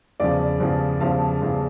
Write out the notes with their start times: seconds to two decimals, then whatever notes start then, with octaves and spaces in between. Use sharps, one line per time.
0.20 E2 C#3 F3 D5 F5
0.60 E2 C#3 F3
1.00 E2 C#3 F3 F5 A5
1.41 E2 C#3 F3